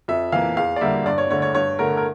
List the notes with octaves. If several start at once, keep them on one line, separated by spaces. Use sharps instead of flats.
F2 E5
E3 A#3 F5
E2 F5
D5
D3 G3 A#3 E5
G2 D5
C#5
D3 A3 C#5
C#5
G2 C#5
D3 A3 A#4
A#4